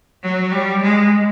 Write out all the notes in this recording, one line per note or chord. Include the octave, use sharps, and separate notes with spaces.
F#3
G3
G#3